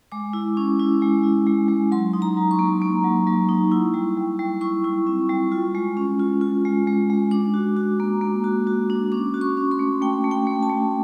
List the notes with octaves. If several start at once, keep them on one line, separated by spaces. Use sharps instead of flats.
G#3 D6
E4
C#4
E4
G#3
E4
G#3
G#3
F#3 C6
D#4
A#5
F#3
C#6
A#3
A#3
F#3
F#3
D#4
E4
G3
G3
G3
E4 C#6
E4
C4
G3
F4
G#3
C#4
F4
F4
G#3
G#3
G#3
D4 D6
F#4
F#4
A#3
A#3
F#4
F#4
D4
C#4 D6
F#4
C#6
C#4
C6
A3
A3 G5
A3
G5
A3
A5
A3